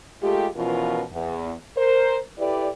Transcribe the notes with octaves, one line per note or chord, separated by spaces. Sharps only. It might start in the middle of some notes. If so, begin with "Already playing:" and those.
G#3 A3 F4 G4
B2 E3 F3 C#4 F4 A#4
E2
A#4 C5
E4 G4 A4 B4 D5